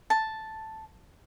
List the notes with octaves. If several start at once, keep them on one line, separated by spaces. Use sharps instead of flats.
A5